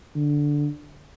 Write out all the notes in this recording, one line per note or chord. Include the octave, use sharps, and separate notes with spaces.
D3